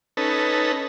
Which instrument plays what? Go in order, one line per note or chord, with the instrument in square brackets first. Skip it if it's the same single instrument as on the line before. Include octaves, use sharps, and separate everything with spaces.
[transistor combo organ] C#4 D#4 A4 B4